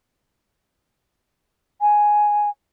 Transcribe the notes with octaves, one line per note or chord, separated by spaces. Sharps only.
G#5